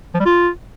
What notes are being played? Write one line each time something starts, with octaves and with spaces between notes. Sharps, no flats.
F3
G3
F4